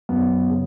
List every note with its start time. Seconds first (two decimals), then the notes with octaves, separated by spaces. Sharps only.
0.09 F#2 B3
0.49 C#3